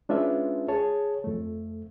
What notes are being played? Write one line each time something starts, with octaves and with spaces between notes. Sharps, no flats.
G#3 C#4 D4 F4 B4 E5
G#4 C#5 A5
F2 A3